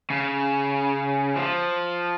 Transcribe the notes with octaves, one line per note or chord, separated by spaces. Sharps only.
C#3
F3